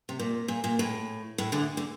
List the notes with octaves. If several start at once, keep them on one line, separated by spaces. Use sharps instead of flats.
C3
A#2
A#2
A#2
A2
A2
D2 D3
D3